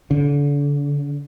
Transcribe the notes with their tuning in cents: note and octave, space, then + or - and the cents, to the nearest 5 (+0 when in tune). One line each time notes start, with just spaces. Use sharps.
D3 -35